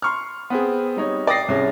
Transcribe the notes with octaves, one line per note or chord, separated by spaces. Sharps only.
C6 C#6 F6
B3 C4 G#4
G3 D#4 C#5
D5 G5 D#6 A#6 C7
C2 C#4 G#4